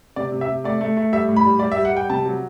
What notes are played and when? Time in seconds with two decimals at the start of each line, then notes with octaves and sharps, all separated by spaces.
0.16 C3 D5
0.32 C3
0.41 E5
0.48 C3
0.64 A3 D5
0.81 A3
0.97 A3
1.12 G3 E5
1.29 A2
1.36 B5
1.46 G3
1.59 G3 D5
1.72 E5
1.77 G3
1.85 F#5
1.93 G3 G5
2.10 C3 A5
2.26 F#3